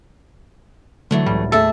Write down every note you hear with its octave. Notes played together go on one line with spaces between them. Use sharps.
D3 E3 F#3 A3
C#2 A2 G3
D#2 A2 A3 G#4 A4 E5 A5